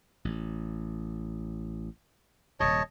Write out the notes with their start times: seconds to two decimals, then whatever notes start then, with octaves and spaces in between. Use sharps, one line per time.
0.25 A1
2.60 D#1 G2 C3 C#5 D#5 A5